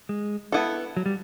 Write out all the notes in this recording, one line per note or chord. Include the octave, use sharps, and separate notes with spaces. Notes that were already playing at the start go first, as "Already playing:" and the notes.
G#3
B3 E4 A4
F#3
G3